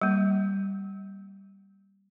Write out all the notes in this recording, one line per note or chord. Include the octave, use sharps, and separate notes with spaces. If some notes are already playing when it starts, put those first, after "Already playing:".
G3 A#3